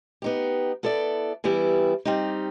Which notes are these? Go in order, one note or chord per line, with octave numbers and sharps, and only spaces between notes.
B3 D#4 G4
B3 E4 A4 D5
E3 G3 B3 E4 G4
G3 C4 D#4 G4